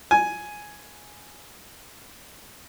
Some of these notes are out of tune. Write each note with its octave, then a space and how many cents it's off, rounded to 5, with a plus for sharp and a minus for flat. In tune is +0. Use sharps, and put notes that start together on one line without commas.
G#5 +5